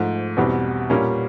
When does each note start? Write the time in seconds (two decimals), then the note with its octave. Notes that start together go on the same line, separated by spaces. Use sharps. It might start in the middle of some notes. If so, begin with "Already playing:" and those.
Already playing: G#2 F3 A3
0.37 E2 B2 G3 C4
0.90 A#2 G3 A#3 C#4